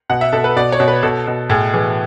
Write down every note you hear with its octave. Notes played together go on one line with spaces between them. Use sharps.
B2 F#5
E5
B2 A4
B4
B2 D5
C#5
B2
B4
B2 A4
B2
A2 G#4
E3 G#4